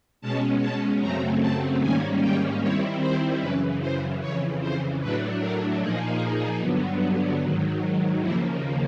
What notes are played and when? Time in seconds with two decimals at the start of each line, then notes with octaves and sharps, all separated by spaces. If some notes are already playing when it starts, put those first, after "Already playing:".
0.21 B2 G#3 C#4 A5
0.61 A5
1.00 F#2 C#3 F#3 A3 C4 A#5
1.40 A5
1.80 G#2 D#3 G3 A#3 C#4 G#5
2.20 G5
2.61 D#3 G3 C4 E4 C#5
3.01 C5
3.40 F#2 C#3 E3 B4
3.81 C5
4.20 F2 C#3 E3 C#5
4.61 C5
5.00 A2 F#3 A3 D4 B4
5.41 A#4
5.80 A#2 F3 A#3 D#4 G#4
6.60 G2 D3 F#3 B3
7.41 G#2 D#3 F#3
8.20 D#2 C#3 F3 A#3 E4